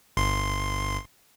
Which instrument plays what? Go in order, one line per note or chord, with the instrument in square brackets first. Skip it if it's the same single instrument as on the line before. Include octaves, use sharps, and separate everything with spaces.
[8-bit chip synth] G1 C6